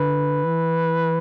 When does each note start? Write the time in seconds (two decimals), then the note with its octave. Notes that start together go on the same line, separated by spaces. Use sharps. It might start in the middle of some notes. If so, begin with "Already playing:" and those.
Already playing: D3 B4
0.44 E3